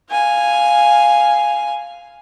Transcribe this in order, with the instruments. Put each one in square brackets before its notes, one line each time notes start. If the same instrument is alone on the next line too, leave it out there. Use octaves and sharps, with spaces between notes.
[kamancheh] F5 G#5